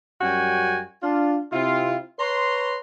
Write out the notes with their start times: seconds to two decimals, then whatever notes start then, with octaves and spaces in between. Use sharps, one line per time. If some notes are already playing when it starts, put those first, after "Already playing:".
0.21 F#2 G3 C#4 F#4 G5 G#5
1.03 D4 F4
1.53 C3 C4 E4 F4
2.19 B4 C#5 A#5 C6